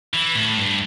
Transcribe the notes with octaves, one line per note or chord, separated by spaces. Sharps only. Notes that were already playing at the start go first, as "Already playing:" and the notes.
E3
A2
G2